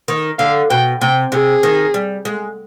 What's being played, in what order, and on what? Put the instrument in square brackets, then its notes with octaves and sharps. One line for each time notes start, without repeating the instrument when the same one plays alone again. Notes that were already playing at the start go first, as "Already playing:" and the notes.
[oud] D#3
[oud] D3 [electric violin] F5
[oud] B2 [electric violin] G5
[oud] C3 [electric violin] G5
[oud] C3 [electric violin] G#4
[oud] D#3
G3
G#3